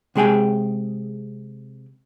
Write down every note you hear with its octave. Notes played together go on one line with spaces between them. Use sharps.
C3 G#3 G#4 G5 G#5